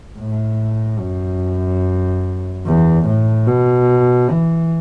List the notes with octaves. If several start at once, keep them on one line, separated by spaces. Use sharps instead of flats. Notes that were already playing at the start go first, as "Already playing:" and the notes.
A2
F#2
E2
A2
B2
E3